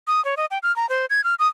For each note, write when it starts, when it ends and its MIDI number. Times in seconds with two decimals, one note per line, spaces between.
0.07 0.23 87
0.25 0.35 73
0.37 0.46 75
0.51 0.58 79
0.63 0.74 89
0.76 0.89 82
0.89 1.06 72
1.10 1.24 92
1.24 1.35 89
1.39 1.48 87